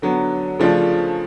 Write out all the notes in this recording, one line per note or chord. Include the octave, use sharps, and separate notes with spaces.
D3 F#3 B3
C#3 F3 A3 D4 F4